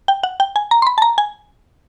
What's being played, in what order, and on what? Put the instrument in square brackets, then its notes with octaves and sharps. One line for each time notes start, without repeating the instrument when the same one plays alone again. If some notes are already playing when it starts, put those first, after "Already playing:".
[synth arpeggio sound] G5
F#5
G5
G#5
A#5
C6
B5
A5
A#5
G#5